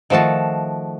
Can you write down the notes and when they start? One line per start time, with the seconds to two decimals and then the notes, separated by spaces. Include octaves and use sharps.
0.10 D#3 F3 A3 F#4 A5